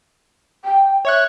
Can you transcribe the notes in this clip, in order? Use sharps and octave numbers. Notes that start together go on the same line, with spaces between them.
G5
C#5 E5 C#6 F#6